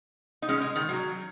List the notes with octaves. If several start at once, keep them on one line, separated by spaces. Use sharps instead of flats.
D#4
G#3 C#4
G#3
D#3
F#3